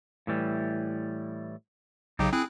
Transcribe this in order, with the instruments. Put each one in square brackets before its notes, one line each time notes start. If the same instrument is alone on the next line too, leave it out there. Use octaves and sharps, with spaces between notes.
[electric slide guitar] A2 E3 G3
[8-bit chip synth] B1 C#3 F#3 [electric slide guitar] D#4 G4
[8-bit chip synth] C4 E4 F#6 [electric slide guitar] G#4